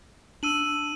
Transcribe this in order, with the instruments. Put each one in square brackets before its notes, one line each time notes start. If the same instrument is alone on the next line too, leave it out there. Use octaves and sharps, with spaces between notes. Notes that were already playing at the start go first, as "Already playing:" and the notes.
[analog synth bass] D4 [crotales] E6 D#7 F#7